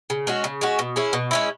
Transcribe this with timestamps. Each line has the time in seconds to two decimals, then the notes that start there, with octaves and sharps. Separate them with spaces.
0.10 C#3
0.27 G#3 C#4 F#4
0.44 C#3
0.61 G#3 C#4 F#4
0.79 B2
0.96 G#3 C#4 E4
1.13 B2
1.31 G#3 C#4 E4